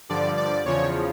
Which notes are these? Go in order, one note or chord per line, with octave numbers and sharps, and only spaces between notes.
G2 D3 F3 D5
D5
E2 C#3 F3 C#5